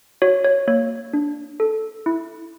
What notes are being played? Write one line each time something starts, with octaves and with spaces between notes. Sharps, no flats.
F#4 C#5
C#5
A#3 C#5
D4
A4
E4